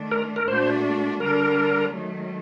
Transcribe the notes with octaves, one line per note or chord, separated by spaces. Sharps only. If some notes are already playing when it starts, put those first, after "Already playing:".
Already playing: D#3 A3 D4
A#4
A#4
A#2 A3 D4 F#4 C5
D3 G3 D4 A#4
D#3 F#3 A3